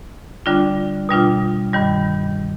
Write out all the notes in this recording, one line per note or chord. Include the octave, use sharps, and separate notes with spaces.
D3 G3 D4 F4
B2 G3 D4 F4
G2 D#3 G3